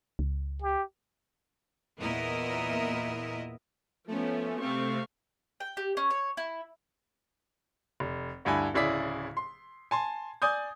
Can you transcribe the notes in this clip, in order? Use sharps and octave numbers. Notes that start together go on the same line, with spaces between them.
C#2
G4
E2 A#2 B3 E4 A#4 D#5
F3 A3 B3 C#4
C3 A3 C4 F5 C#6
G5
G4
C#4
C#5
E4
F1
D2 G2 E4 G#5 B5
D1 C#3 E4 G#4 D5 B6
C6
G#5 A5 C6
D5 G#5 D#6 G6